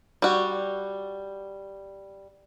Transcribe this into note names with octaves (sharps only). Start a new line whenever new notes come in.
G3 F#4